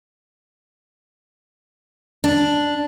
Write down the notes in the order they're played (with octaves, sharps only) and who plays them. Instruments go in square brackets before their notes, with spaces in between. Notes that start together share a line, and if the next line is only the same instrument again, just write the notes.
[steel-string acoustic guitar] D4